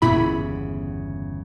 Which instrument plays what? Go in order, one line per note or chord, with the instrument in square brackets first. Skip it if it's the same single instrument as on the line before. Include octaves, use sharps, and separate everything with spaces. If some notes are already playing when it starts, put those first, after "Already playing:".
[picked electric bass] G1 E2 C#3 [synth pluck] A#2 E4 B5